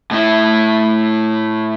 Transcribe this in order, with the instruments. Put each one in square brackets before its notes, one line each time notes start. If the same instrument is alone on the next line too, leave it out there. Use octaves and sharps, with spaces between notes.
[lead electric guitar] A2 E4